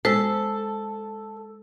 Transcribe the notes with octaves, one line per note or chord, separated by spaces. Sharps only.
G#3 A4 C5